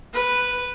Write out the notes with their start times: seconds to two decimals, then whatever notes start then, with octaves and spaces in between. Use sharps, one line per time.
0.14 B4